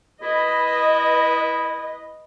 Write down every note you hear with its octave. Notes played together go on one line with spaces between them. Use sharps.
E4 B4 D#5